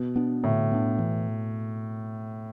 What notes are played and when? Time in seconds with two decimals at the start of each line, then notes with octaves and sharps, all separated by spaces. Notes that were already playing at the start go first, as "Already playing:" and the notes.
Already playing: B2
0.16 B3 D4
0.44 A2 D3
0.71 B3 D4
0.99 E3